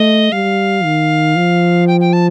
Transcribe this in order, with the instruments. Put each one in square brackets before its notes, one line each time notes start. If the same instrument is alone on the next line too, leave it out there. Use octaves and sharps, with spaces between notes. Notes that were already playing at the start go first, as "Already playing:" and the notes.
Already playing: [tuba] A3 [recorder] D#5
[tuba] G3 [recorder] F5
[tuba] D#3
F3
[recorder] G5
G5
A5